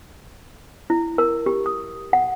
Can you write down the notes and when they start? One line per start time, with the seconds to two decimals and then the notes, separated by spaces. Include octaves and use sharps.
0.90 E4
1.18 A#4
1.46 G4
1.66 D#6
2.13 F#5